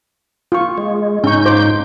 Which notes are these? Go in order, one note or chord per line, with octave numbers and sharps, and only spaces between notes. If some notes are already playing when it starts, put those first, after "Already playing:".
F4 C#6
G#3
G#2 C#4 D#4 C#6 G6
F4 C5 D6